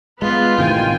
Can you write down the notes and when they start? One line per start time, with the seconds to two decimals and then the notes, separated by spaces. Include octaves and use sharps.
0.22 G#3 B3 F4 B4
0.58 A1 C3 D#3 G5 G#5